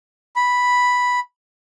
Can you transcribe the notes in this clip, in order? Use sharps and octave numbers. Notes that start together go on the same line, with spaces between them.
B5